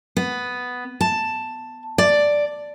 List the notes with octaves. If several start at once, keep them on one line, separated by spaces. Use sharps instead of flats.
B3
A5
D5